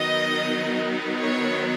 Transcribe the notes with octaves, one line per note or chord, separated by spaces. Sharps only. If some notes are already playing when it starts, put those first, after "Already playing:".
Already playing: D#3 F#3 B3 D#4 D#5
C#5